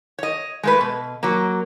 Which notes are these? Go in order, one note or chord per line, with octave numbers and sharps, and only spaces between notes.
C#5 D#5
G#3 A3 B4
B2
F#3 A#3